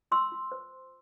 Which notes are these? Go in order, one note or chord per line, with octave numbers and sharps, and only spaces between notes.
F4 C6 E6
F4
C5